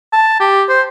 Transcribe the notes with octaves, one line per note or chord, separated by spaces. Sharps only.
A5
G4
C5